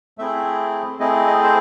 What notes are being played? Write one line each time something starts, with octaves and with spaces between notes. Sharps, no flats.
A3 C4 E4 G#4 E5
A3 C4 E4 G#4 D#5
D#5
C5